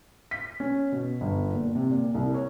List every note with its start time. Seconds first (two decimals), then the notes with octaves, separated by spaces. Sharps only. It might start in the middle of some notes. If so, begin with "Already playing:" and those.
0.31 B6
0.60 C#4
0.92 B2
1.21 G1
1.53 A#2
1.75 C3
1.91 A#2
2.14 C2
2.34 C#5